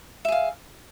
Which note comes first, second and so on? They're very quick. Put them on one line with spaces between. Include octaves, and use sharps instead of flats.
E5 G#4 F5